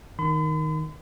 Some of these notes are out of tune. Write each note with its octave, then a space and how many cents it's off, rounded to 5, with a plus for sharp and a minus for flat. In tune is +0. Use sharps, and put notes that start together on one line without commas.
D#3 +0 B5 +45